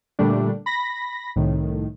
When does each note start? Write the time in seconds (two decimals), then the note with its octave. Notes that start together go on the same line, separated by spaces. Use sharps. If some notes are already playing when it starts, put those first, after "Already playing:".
0.19 A#2 D3 G3 A3 D4
0.66 B5 A#6
1.36 C2 A2 D#3